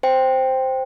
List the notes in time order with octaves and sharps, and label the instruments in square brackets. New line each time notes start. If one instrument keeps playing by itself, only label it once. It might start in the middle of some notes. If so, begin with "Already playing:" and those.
[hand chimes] C5 G5